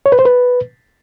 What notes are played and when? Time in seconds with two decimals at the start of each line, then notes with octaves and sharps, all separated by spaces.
0.06 C#5
0.12 B4
0.19 C5
0.25 B4